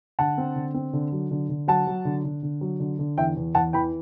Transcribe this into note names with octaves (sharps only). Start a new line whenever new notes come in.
D3 F#5 A5
C4
D3
C4
D3
F#3
D3
D3
F#3 F#5 A5
F#3
D3
D3
D3
F#3
D3
D3
E2 E5 G5
E2
E2 F#5 A5
E3 G5 B5